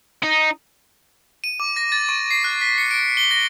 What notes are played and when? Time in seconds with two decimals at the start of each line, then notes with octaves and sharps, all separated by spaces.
0.23 D#4
1.44 D#7
1.60 D6
1.76 A#6
1.92 A6
2.09 C#6
2.31 C7
2.44 F#6
2.61 B6
2.78 C#7
2.91 D7
3.17 G7
3.31 A#6